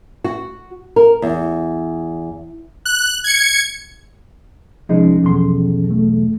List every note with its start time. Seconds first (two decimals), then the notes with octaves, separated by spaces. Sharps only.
0.24 F#4
0.96 A#4
1.22 E2
2.85 F#6
3.24 G#6 C#7
4.89 C2 F3 G#3 C#4 D#4
5.23 B1 E2 C6
5.91 A3